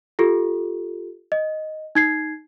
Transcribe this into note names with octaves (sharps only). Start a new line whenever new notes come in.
F4 G4 A4
D#5
D#4 G#6 C7